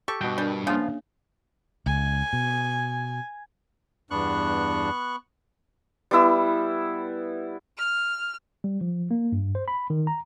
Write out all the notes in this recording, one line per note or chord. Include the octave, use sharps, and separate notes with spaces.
G4 A4 C#6
G2 B2 F#4 G5
G3 D4 A#4
C#3 F3 A#3 B3 D4 F4
C#2 G#5
B2
E2 G2 B3 D4 C#6 F#6
G3 B3 E4 E6
F6
G3
F3
A#3
G2
C5
B5
D#3
A#5